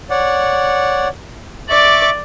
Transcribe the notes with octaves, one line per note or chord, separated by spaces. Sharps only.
C#5 D5 F#5
D5 E5 C#6 D6